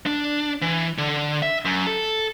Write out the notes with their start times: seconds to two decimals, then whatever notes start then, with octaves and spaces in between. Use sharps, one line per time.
0.07 D4
0.62 E3
0.98 D3
1.42 E5
1.65 F#2
1.87 A4